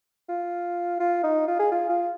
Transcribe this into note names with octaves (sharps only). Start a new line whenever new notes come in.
F4
F4
D#4
F4
G#4
F4
F4